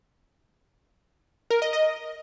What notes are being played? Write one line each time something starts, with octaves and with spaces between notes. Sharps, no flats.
A#4
D#5
D#5